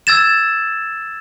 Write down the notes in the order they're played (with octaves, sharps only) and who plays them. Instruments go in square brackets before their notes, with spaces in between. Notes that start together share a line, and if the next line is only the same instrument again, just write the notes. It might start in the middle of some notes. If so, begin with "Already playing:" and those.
[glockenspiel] E6 G#6 A6 E7